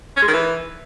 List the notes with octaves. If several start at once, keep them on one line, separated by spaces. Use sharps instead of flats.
C#4
G#3
D#3
E3